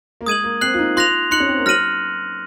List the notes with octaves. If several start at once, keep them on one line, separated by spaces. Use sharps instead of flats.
A#3
G#3 D#6 G#6 D#7 F#7
A#3
C4 F#6 C7 F#7
F4
D#4
F4 C6 F#6 A#6 F7
D#4 C6 F#6 C#7 F#7
C#4
C4
A#3
F#3 F6 A#6 D#7 F#7